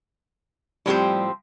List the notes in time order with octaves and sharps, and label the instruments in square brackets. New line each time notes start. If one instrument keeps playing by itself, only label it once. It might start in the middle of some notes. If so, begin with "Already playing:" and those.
[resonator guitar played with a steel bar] A2 F3 C4 G4 C5 [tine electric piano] G3